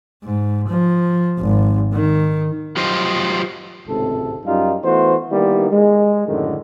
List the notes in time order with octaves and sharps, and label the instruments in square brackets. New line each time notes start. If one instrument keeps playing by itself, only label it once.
[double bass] G#2
F3
G#1
D#3
[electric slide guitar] F#3 F4 G4 C5 D#5
[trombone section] G#1 C#2 A2 C3 A4
F#2 G3 D#4 F4
E3 A3 B3 F#4 C5
D#3 G3 A#3 B3 E4
G#3
F#2 A2 D3 D#3